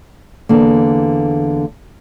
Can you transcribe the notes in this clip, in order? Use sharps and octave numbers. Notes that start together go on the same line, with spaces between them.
E2 D3 A#3